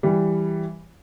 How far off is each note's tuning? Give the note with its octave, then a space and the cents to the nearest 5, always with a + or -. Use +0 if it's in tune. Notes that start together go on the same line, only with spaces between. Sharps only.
E3 +0 G3 +0